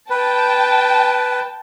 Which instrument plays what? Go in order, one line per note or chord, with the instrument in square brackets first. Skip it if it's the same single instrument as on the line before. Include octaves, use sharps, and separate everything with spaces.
[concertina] B4 [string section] G5 A5